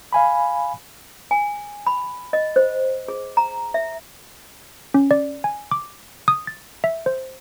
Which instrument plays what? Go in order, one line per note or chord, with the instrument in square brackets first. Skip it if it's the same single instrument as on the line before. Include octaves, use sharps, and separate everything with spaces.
[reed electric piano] F5 G#5 B5
[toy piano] G#5
B5
D#5
C5
G#4
A#5
E5
[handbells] C#4
D5
G#5
D6
D#6
A6
E5
C5